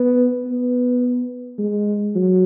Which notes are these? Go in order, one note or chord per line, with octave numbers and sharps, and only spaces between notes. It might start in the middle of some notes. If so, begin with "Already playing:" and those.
Already playing: B3
B3
G#3
F#3